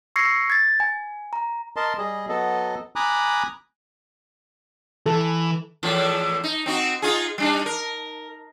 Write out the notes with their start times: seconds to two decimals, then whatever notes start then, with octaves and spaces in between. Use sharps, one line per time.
0.16 C#6 E6 G#6 A#6 C7 C#7
0.50 G#6 A6
0.80 G#5
1.33 A#5
1.76 A#4 D#5 A5 C6
1.98 G3 G#4 D#5
2.29 F#3 B3 A4 D#5
2.96 G#5 A#5 B5 D6 D#6 F#6
5.06 E3 A4
5.83 E2 A2 F3
6.44 D#4
6.66 C4 D#4 F#4
7.02 D#4 F4 G#4
7.38 G3 D4 D#4
7.66 A#4